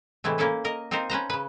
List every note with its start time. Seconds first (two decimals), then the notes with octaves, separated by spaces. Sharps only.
0.24 A2 C3 E3 G#3 A3
0.38 A#3 C#4 E4 A4 B4
0.64 A#4 D#5
0.91 C4 D#4 F4 A#4 C5
1.10 C#4 B4 C5 A#5
1.30 C#3 B4